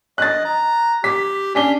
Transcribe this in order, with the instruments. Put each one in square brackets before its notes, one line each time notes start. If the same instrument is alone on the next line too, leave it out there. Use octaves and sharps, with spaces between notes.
[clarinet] D#5 [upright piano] F#6 A6
[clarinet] A#5
[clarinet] G4 [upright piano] B6
[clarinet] C#4 [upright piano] D4 B6 G7